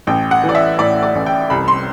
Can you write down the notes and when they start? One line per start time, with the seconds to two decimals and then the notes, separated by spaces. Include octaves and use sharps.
0.07 A1 G5
0.31 F#5
0.43 E3
0.49 D5
0.55 E5
0.78 A2 D5
1.03 D5
1.15 A1
1.26 G5
1.50 C2 B5
1.68 C6